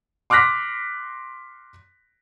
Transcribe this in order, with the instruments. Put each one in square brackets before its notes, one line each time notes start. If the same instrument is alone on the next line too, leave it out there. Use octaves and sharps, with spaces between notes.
[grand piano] C6 D6 F6 F#6 A#6 B6